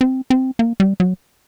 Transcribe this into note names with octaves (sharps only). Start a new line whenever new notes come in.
C4
C4
A#3
G3
F#3